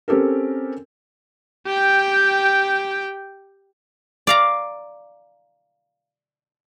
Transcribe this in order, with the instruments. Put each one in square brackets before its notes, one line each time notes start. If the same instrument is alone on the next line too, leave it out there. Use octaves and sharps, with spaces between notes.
[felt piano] C4 C#4 G4 A4 A#4
[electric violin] G4 G5
[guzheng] D5 F5 A#5